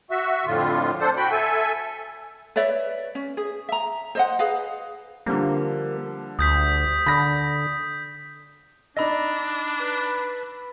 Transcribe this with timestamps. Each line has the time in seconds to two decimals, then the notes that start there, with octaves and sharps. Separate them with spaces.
0.11 F#4 E5
0.46 F2 A2 D3 F4
1.00 D4 A4 C5
1.17 F#4 G5 B5
1.32 A4 E5 G#5
2.56 B4 C#5 D5 E5
3.15 C#4
3.37 G#4
3.69 E5 A#5
4.15 C5 D#5 F#5
4.39 G#4 B4 D#5 F5
5.26 D3 F3 G3 A#3
6.39 D2 D#6 G6 B6
7.06 D3 B5 A#6
8.97 D4 D#4 D5 D#5 B5 E6 A#6
9.80 B4